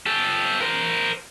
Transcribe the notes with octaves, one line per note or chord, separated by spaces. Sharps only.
G4 A4
A#4 C5